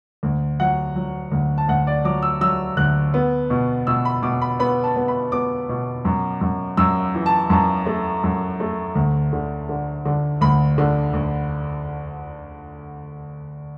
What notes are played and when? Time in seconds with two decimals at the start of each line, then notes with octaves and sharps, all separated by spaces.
0.23 D2
0.60 F#3 F#5
0.96 F#3
1.32 D2
1.58 A5
1.68 D2 F#5
1.87 D5
2.05 F#3 D6
2.22 E6
2.41 F#3 E6
2.77 D2 F#6
3.14 B3
3.50 B2
3.87 B2 E6
4.05 B5
4.22 B2 D6
4.42 B5
4.60 B3 B5
4.84 A5
4.96 B3
5.08 B5
5.32 B3 D6
5.69 B2
6.05 F#2
6.41 F#2
6.77 F#2 E6
7.15 E3
7.26 A5
7.50 F#2 A5
7.86 A3
8.24 F#2
8.60 A3
8.95 D2
9.33 D3
9.69 D3
10.05 D3
10.41 D2 B5
10.78 D3
11.13 D2